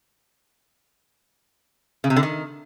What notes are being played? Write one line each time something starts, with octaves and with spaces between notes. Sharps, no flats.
C#3
C3
D3
D#3